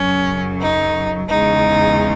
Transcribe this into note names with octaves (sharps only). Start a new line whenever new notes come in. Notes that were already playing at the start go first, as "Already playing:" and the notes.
Already playing: F#2 C#3 F#3 C#4
D#4
E2 C#3 G#3 D#4